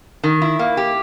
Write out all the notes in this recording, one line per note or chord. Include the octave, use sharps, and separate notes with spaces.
D#3
E4
A#3
G4